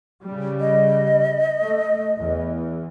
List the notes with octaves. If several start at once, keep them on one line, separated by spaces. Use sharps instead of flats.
C#3 G3
D#5
A3
E2